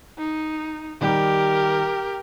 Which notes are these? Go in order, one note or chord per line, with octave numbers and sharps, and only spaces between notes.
D#4
D#3 G3 G4 A#4